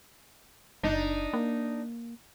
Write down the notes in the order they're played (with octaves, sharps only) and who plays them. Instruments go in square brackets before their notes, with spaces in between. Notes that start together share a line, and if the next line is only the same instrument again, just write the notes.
[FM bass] F#1 [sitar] D4 D#4
[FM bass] A#3